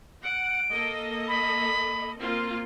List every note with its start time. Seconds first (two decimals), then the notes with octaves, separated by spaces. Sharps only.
0.25 F#5 D7
0.70 A#3 A4 D#5
1.28 B5
2.19 A#3 C4 F4